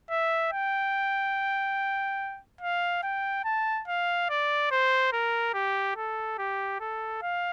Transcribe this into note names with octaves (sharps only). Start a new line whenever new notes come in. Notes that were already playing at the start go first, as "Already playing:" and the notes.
E5
G5
F5
G5
A5
F5
D5
C5
A#4
G4
A4
G4
A4
F5